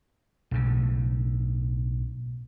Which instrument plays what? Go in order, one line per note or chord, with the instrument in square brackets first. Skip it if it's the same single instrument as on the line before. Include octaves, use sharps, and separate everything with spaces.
[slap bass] B1 A2 C#3